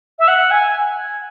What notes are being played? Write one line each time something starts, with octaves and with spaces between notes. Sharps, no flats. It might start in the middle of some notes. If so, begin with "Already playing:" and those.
E5
F#5
G#5